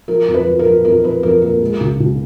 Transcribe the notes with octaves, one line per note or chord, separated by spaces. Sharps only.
F3 A#4
F2
B4
F3
A#4
F3
F2 A#4
F2 B4
F2 A#4
A#3 A#4
G#3
C#2
C#2